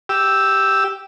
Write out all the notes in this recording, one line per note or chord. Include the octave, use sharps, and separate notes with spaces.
G4 E6